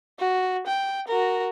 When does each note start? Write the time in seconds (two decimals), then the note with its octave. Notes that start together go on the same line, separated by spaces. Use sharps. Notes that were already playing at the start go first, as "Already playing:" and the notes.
0.19 F#4
0.67 G5
1.08 F#4 A#4